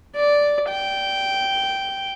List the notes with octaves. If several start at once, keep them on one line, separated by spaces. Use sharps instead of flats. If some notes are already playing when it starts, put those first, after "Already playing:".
D5
G5